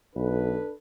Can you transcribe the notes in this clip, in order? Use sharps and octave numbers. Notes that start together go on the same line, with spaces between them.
B1 D4 A4 B4